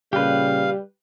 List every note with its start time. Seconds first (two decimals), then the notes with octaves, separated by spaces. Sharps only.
0.13 A#2 C#3 G3 G4 B4 F5